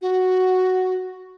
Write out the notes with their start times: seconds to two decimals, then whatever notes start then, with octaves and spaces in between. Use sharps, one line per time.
0.02 F#4